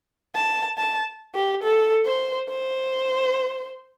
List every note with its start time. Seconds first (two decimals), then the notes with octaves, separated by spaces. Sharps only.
0.35 A5
0.78 A5
1.35 G4
1.63 A4
2.05 C5
2.49 C5